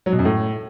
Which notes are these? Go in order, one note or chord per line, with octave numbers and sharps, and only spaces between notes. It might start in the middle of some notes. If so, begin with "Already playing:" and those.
F#3
B2
F#2
A2